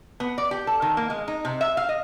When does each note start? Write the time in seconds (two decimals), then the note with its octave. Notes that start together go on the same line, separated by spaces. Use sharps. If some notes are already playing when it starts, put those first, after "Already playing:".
0.20 B3
0.38 D5
0.51 G4
0.67 A4
0.82 D#3
0.97 A#3
1.10 G#3
1.28 D#4
1.45 C3
1.61 E5
1.77 F5
1.89 D#5